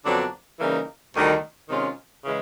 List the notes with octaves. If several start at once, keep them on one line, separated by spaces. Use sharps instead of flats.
F2 D3 F#3 B3 D4
C#3 E3 G3 A#3 D#4
D2 C3 D#3 G3
C3 D#3 G#3 C#4 F4
C#3 E3 G#3